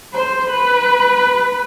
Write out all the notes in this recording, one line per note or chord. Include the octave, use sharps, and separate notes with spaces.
C5
B4